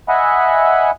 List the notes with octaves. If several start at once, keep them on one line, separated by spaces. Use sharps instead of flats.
D#5 E5 F#5 G#5 B5